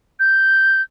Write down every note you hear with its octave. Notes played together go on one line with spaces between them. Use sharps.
G6